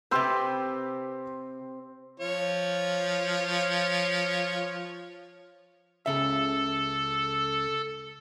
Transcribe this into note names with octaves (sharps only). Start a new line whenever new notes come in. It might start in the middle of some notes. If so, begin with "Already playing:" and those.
C3 C4 G4 B4 C6 E6 G6
F3 F4 C#5
C#2 C#3 A4 E5